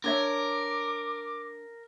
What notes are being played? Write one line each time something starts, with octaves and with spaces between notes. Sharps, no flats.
D4 A#4 C#5 E5 D6